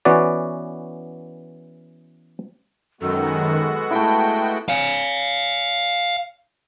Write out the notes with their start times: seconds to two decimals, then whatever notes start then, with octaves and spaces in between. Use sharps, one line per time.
0.05 E3 B3 C#4 F#4 D5
3.01 F#2 D#3 G#3 B3 F#4 A4
3.91 A3 E4 G5
4.69 F5 G#5